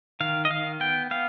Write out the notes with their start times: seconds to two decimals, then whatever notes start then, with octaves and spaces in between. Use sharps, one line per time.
0.20 D#3 F5
0.45 D#5
0.50 D#3 F5
0.80 B3 G5
1.11 B3 F5